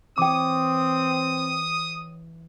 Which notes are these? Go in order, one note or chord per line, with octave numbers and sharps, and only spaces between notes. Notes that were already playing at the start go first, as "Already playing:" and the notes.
E3 C4 C#5 G5 D6 D#6